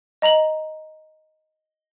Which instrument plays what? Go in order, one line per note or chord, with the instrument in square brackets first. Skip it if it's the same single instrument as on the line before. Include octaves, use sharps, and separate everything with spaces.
[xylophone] D#5 A#5 F7 F#7